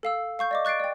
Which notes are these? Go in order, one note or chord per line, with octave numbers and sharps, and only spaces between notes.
A4 F5 E6
F5 C#6 G6
D5 D#5 D6
C#6 F#6 A6 C7 D7
D5 G5